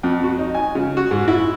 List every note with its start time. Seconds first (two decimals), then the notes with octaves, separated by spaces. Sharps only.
0.03 F2
0.24 F#4
0.39 D#4
0.55 G#5
0.75 C#3
0.97 F#4
1.11 G#2
1.28 E4